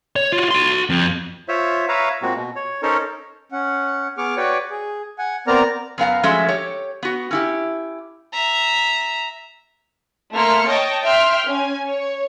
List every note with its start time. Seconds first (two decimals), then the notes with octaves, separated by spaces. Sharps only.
0.16 C#5
0.32 F4 F#4
0.51 F#4 C6
0.90 F2
1.48 F4 C5 C#5 E5
1.89 B4 C#5 E5 F5 A#5
2.22 A#2 G#3 A#3 C4 F#4
2.36 B2
2.56 C#5
2.83 C#4 D#4 A4 A#4 C5 C#5
3.52 C#4 F#5
4.18 B3 G#4 C#6 D6 F6
4.37 F#4 B4 C#5 D5 G5
4.70 G#4
5.19 F#5 G#5
5.47 B3 C4 A#4 D5 A#5 F6
5.98 F#2 B3 F5 A#5
6.23 F3 F#3 G#3 A3 C#4 E5
6.48 G4 C#5
7.03 B3 F#4
7.31 C#4 E4 G4
8.34 E5 A#5
10.33 A3 A#3 C6 F6 C#7
10.68 C#5 D#5 G5 A5 C#6
11.03 E5 G5 C6 F6
11.47 C#4 G#5
11.85 C#5